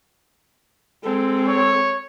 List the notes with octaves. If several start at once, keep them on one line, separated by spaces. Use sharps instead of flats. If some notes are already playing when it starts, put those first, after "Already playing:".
G#3 C4 A4
C#5